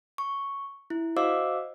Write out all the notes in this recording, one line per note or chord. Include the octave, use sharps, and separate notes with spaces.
C#6
E4
F#4 C5 D#5 F5 D6 E6